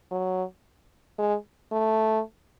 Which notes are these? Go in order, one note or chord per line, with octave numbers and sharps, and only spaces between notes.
F#3
G#3
A3